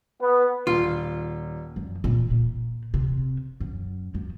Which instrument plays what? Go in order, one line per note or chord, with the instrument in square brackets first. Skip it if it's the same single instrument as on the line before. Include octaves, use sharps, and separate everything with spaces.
[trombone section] B3
[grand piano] D#1 [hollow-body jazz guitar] F4
[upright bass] F#2
A#2
A#2
C3
F#2
F#2